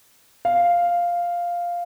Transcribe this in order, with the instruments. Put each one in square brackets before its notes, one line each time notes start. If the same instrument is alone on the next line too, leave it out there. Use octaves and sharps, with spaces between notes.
[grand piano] F5